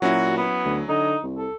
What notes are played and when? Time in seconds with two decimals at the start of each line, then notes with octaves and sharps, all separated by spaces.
0.02 A#2 F#3 C#4 E4 F#4
0.38 B3
0.65 D2
0.89 D3 D#4
1.23 C2
1.38 A4